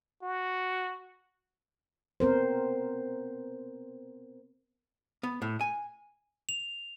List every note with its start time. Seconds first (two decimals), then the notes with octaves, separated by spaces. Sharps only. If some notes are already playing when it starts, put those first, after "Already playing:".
0.22 F#4
2.20 B3 C4 A#4 C5
5.23 B3
5.42 A2
5.61 G#5
6.49 F7